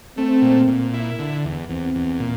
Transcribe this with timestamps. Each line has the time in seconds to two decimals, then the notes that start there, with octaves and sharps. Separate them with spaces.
0.17 A3 C4
0.42 A#2
0.67 A#2
0.94 E4
1.19 D3
1.45 E2
1.69 E2 C4
1.95 E2
2.20 A#2